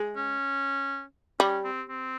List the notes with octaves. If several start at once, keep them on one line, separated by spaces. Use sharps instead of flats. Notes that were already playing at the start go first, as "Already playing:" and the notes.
Already playing: G#3
C#4
G3 C#4
C4
C4